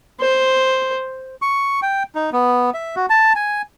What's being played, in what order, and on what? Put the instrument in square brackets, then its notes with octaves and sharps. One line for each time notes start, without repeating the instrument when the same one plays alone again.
[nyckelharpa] C5
[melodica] C#6
G5
D#4
B3
E5
F#4
A5
G#5